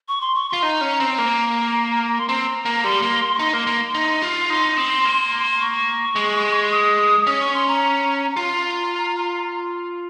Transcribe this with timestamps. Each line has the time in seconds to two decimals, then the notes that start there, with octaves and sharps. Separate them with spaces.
0.08 C#6
0.21 C6
0.35 C#6
0.49 F4 C6
0.63 D#4 A#5
0.81 C#4
1.00 C4
1.18 A#3 A#5
2.18 C6
2.29 C4 A#5
2.65 A#3
2.84 G3 C6
3.02 A#3
3.35 C#6
3.39 D#4 C6
3.53 A#3
3.67 A#3
3.95 D#4
4.22 F4
4.50 D#4 C6
4.77 C4
5.05 A#3
5.60 C#6
6.16 G#3
6.71 D#6
7.27 C#4 D#6
7.40 C#6
7.54 C6
7.68 A#5
8.36 F4 A#5